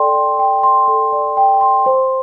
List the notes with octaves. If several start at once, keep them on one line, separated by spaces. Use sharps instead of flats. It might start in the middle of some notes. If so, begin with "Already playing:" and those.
Already playing: A4 D5 G5 C6
D5
G5
C6
A4
D5
G5
C6
C5